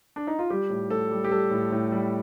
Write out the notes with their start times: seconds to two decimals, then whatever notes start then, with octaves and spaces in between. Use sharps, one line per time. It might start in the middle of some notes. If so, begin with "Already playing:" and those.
0.16 D4
0.27 D#4
0.39 F4
0.50 G3 G4
0.70 A2
0.90 A2 A4
1.11 G3
1.24 G4
1.31 G3 A4
1.51 A2
1.72 A2
1.92 G3